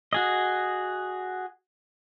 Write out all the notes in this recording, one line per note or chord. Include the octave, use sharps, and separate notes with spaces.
F#4 G#4 D#5